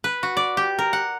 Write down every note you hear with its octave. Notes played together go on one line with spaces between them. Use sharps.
B4
F#4
D5
G4
A#4
F#5